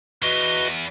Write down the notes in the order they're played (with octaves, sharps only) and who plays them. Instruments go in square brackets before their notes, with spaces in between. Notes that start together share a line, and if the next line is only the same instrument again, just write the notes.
[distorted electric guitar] E2 [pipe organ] F#4 B4 D#5 [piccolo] G7